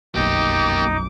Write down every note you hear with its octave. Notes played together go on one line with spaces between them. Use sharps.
F1 B1 F#2 A#3 D#4 G4 D6